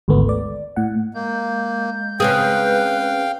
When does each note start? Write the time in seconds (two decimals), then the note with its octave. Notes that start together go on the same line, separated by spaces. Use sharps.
0.08 G#1 D2 G#2 A3 B3
0.29 D5
0.76 A2 F#5
1.14 G#3 A#3 G6
2.20 C#3 C4 G#4 B4 F5 G5